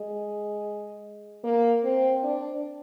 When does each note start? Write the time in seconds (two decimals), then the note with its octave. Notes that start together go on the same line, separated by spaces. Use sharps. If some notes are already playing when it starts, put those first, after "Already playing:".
Already playing: G#3
1.44 A#3
1.84 C4
2.24 D4